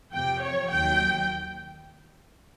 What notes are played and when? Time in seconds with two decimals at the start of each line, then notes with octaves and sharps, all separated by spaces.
0.13 F2 C3 F3 G5
0.42 C#5
0.71 D#2 D#3 F#3 G5